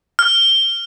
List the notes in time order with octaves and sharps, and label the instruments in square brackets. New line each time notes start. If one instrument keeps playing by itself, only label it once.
[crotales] F6